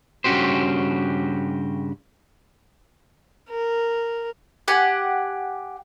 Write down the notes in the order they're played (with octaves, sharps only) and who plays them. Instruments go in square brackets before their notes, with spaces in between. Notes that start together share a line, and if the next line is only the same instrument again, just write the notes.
[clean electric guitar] G2 C#3 C#4 F#4 G4 C5
[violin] A#4
[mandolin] G4 F#5 G#5